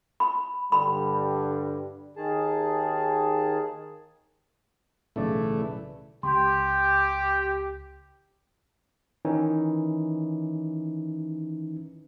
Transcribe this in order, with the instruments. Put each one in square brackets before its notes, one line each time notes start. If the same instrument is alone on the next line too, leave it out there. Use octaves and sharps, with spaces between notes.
[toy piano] B5
[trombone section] G2 D3 G3 [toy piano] B5
[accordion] D#2 D#3 G#4 A5
[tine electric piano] B1 C#3 D5 [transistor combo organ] A2 E3 A3
[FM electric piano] C#2 [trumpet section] G4 [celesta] C6
[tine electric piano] D#3 E3 C#4 D#4